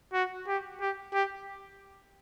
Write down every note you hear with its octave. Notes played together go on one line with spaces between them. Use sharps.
F#4
G4
G4
G4